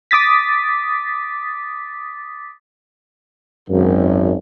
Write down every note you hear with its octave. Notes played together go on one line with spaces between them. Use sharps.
D6 D#6 A6 B6
G#1 F#2